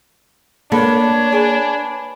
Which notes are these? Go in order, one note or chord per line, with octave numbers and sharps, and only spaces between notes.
A#3 D4 A4 B4 C#5 C#6
G#4 B4